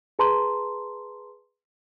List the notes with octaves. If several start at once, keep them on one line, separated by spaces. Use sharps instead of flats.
G#4 B4 A5 A#5 C6